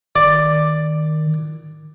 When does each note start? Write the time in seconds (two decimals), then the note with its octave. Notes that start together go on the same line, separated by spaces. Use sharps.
0.16 D#3 D5